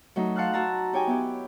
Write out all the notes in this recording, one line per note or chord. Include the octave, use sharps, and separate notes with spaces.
F#3 A3 D#4
F5 F#5 A5 C6 F6 F#6
F#4 A5 A#5 E6
D#4 G4 C#5 G5 G#5
B3 E4 G4